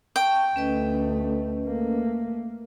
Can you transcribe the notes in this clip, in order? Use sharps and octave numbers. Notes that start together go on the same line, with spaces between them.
E5 G5 A5 C#6
D2 A3 C#4 B4 D#5
A3 A#3